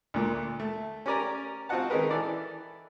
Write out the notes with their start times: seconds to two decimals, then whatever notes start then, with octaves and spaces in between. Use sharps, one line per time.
0.14 D2 A#2 A#3
0.60 A3
1.06 C#4 G4 A#4 D5 G#5 A#5
1.69 C4 F4 F#4 D#5 F#5 A5
1.90 D#3 C#4 D#4 G#4 A#4 B4
2.11 E3 A4 D5